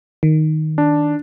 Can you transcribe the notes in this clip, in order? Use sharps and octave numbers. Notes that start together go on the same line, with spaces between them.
D#3
D4